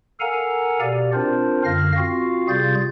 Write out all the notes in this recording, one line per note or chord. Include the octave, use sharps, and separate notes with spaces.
A4 A#4 F5 F#5 G#5 A#5
B2 G4 D5
C4 D4 F4 A#4 C5
F#2 D3 F5 F6 A#6
C4 F4 F#4 F5
C3 G3 F4 G#4 G6 A6